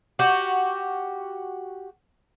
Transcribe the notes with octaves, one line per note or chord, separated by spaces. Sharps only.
F#4 G4